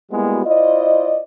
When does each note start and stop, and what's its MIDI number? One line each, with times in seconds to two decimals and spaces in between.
0.11 0.41 55
0.11 0.41 56
0.11 0.41 58
0.11 0.41 59
0.11 0.41 64
0.11 0.41 66
0.46 1.21 64
0.46 1.21 65
0.46 1.21 72
0.46 1.21 74
0.46 1.21 75